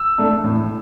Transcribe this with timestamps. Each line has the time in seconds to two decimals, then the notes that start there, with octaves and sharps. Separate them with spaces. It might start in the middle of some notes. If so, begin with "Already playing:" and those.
Already playing: E6
0.18 A3 D4
0.44 A2